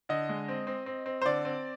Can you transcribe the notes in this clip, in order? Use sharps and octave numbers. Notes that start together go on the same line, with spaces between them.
D3 D#5
G#3
C4
C4
C4
C4
C5
D3 D5
C4